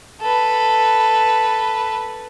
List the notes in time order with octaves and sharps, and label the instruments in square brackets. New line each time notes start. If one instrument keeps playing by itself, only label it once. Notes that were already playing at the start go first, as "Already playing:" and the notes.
[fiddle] A4 B4